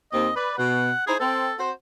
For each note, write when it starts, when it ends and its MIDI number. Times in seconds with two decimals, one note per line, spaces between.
0.12 0.29 39
0.12 0.29 60
0.12 0.33 75
0.36 0.56 71
0.36 0.57 74
0.58 0.90 47
0.58 1.02 78
1.07 1.15 63
1.07 1.15 64
1.07 1.15 68
1.07 1.15 72
1.20 1.50 60
1.20 1.56 69
1.58 1.71 60
1.58 1.71 66
1.58 1.71 72